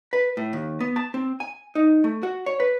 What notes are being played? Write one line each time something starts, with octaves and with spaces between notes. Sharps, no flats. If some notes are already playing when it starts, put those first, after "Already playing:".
B4
A2
D#2
B3
A5
C4
G#5
D#4
A3
F#4
C#5
B4